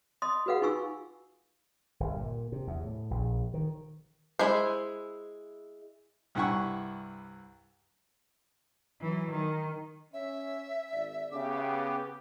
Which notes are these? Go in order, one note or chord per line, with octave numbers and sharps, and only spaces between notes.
D#5 C6 D#6
F#4 G#4 B4 F5 F#5
D#4 F4 G#5 C#6 E6
G1
A#2
C3
E2
A2
A#1
D#3
G#3 E4 C5
C2 G2 E4 F#5 G#5 C#6
E3 F#3
D#3
C#4 C#5 E5
G#1 D5
C#3 B3 G4 D6